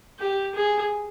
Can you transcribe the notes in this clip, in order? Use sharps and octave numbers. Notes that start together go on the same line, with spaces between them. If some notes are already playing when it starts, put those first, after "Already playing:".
G4
G#4